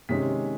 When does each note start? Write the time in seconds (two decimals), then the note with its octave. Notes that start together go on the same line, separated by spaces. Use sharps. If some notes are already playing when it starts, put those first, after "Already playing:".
0.09 C3 D#3 G#3 C#4 B6